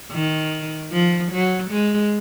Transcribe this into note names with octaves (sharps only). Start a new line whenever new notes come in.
D#3
F3
F#3
G#3